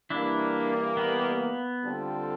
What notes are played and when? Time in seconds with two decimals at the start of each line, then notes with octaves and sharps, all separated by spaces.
0.10 E3 G3 A#3 D4 E4
0.97 B3
1.84 D3 G3 C4 F4 A4